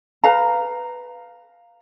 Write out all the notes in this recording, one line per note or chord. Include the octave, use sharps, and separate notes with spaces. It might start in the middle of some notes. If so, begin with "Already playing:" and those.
B4 F5 A#5